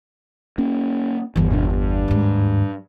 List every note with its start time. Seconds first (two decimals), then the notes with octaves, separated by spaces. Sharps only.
0.58 A#3 C#4
1.36 G1 E2 D#3 E3 G3
1.50 G2 B2 D4
1.70 G2
2.08 D#2 G#2